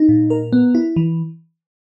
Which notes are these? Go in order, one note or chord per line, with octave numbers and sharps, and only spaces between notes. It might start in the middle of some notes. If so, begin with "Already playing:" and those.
Already playing: D#4
A#2
A#4
B3
E4
E3